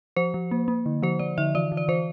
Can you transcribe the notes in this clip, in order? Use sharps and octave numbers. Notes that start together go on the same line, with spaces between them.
F3 C5
F3
A#3
A#3
D3
F3 C5
F3 D5
D3 E5
E3 D5
E3
D5
E3 C5